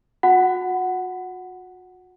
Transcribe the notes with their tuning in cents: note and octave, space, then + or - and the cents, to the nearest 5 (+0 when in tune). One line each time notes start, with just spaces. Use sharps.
F#4 -40 F#5 +5 A5 +0